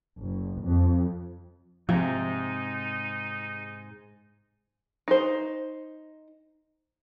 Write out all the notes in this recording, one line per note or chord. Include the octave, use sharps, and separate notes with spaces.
F#1
F2
G#2 C3 F3 D#4
D#4 C5